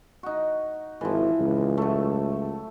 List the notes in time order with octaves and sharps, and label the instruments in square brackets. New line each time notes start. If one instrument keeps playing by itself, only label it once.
[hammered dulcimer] D#4 F#4
[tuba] G#1 [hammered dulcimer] E3 F3
[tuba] C#2
[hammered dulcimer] F#3 A3